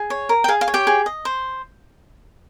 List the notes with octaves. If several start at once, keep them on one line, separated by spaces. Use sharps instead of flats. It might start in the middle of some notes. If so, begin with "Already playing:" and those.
Already playing: G#4
C#5
A#4
G5
G#4 F5
F5
C#5
G4 G5
G#4
D#5
C5